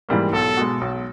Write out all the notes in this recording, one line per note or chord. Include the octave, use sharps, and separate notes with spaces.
G#2 E3 G3 A#3
B1 A4
B2 G#3
B1